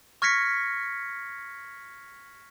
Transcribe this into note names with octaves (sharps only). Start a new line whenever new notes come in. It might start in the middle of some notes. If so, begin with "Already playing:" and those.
C#6 F6 G#6 A#6 B6 C#7